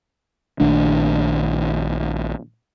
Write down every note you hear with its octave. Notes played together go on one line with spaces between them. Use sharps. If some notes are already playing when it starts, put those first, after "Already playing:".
A#1 D#3 A3 D4